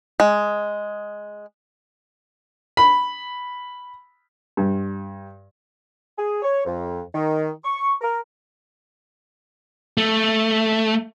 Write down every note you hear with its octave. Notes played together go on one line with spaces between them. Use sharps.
G#3
B5
G2
G#4
C#5
F2
D#3
C#6
A#4
A3